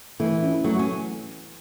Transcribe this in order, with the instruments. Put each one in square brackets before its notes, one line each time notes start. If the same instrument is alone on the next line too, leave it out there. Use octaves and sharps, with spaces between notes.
[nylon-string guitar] E3 [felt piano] A3
[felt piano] C#4
[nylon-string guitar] F#3 [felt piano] A3
[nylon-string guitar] C#4